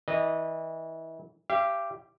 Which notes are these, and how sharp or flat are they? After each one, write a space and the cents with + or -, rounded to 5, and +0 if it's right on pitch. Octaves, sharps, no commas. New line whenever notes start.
E3 -30 D#5 -20
G4 +0 F5 -45